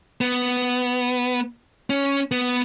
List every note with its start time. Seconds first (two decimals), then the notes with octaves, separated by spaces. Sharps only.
0.21 B3
1.90 C#4
2.32 B3